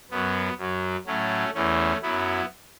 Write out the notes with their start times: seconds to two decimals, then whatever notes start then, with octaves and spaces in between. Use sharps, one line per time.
0.11 F#2 F#3 B3
0.58 F#2 F#3
1.06 A2 F#3 A3 C#4
1.54 E2 E3 A3 C#4
2.02 F#2 F#3 B3 E4